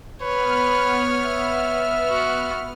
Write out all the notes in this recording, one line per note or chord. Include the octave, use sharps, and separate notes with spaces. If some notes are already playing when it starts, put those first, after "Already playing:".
B3 B4 C#5 F6
E5
F#4